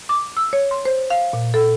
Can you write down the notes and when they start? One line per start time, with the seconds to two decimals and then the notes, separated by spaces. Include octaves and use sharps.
0.09 D6
0.37 E6
0.53 C#5
0.71 C6
0.86 C5
1.10 F5
1.33 A#2
1.54 A4